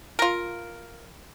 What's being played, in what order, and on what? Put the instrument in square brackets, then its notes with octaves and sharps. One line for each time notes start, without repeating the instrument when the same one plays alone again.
[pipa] F4 A#4